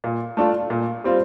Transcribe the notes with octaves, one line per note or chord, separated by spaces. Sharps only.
A#2
A3 D4 F4
A#2
G3 C4 F4